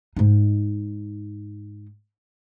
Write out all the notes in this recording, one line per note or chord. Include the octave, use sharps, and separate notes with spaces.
G#2 D#4